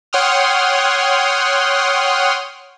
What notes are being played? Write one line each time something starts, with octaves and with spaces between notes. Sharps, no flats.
C#5 F#5 G5 C6 D#6 F6